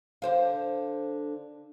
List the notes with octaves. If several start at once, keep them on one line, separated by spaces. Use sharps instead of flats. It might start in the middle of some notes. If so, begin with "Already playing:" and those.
D3 C5 F5